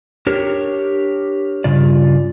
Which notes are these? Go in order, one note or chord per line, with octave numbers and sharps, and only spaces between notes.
D4 G4 A#4 C#5
G2 C#3 F4 D5